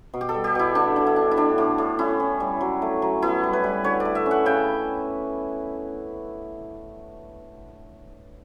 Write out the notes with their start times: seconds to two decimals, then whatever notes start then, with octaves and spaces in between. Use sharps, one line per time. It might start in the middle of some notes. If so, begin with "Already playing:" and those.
0.14 B2
0.21 G4
0.29 A4
0.34 G3
0.44 G4
0.55 B2 E4
0.75 D3 D4
0.96 D3
1.07 E4
1.16 D4
1.31 E4
1.37 A2 D4
1.58 A2
1.78 A2
1.99 C#4 E4
2.20 C#4
2.40 G3
2.61 F#3
2.82 A3
3.02 F#3
3.22 B3 E4
3.43 G3
3.53 B4
3.64 G3
3.84 D3 C#5
4.00 D5
4.05 A3
4.15 E5
4.26 C#4
4.31 F#5
4.46 C#3 G5